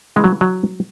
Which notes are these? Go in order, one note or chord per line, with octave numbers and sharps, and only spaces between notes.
C#3 E3 G#3
F#3
F#3